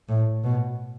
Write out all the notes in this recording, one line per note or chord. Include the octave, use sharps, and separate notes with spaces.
A2
B2